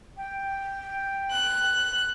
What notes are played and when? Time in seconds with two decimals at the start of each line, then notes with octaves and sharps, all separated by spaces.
0.17 G5
1.30 F#6